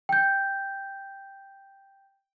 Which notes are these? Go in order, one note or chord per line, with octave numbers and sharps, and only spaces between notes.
G5 G6